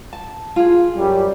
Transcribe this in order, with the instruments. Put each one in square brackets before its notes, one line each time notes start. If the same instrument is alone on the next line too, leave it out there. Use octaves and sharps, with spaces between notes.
[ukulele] A5
F4 G#4
[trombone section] F#2 G3